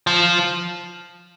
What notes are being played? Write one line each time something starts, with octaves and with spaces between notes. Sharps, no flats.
F3